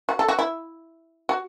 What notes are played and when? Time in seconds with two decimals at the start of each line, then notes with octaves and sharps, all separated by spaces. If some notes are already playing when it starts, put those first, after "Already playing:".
0.09 F#4
0.19 A4
0.28 F#4
0.39 E4
1.29 F#4